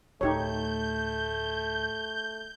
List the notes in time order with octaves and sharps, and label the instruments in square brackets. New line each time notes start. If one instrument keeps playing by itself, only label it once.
[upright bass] D2 A2 [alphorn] A3 [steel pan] D#4 G4 C#5 [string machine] G6